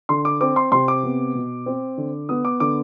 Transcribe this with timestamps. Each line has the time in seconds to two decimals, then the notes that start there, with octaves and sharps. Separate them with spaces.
0.09 D3 C6
0.25 D6
0.41 C4 D6
0.56 C6
0.72 C3 C6
0.88 D6
1.03 B3
1.35 B2
1.66 C4
1.98 D3
2.29 B3 D#6
2.45 D6
2.60 D3 D6